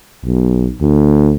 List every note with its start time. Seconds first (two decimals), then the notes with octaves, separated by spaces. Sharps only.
0.25 B1
0.81 D2